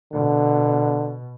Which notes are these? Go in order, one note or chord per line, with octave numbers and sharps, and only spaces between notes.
B2 D3